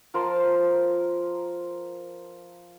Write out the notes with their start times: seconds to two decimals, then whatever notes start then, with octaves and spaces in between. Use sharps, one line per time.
0.14 F3 A#4 A5 C6